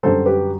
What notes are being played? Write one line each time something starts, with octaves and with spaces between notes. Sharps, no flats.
F#2 D3 G3 A4 C5
G4 B4